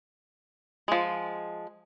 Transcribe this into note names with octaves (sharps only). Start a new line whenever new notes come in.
F3 G#3